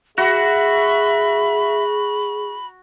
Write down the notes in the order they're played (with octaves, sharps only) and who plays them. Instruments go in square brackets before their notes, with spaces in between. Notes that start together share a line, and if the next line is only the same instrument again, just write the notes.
[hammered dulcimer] F#4 [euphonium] G#4 [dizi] E5 [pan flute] B5